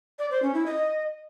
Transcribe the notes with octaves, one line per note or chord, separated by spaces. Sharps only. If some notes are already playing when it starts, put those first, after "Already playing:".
D5
C5
C#4
E4
D#5